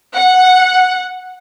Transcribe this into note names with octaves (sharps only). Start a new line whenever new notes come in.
F#5